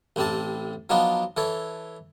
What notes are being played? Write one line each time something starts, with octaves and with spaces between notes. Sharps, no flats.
A1 A2 C4 G4 A5
F3 F#3 B3 D4 D#4 F4
E3 A4 C#5